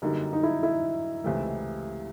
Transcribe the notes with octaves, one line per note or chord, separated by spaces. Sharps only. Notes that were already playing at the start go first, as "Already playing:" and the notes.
F#2 D3 G3 A#3 D#4
D#4
E4
E4
C#2 C3 E3 A3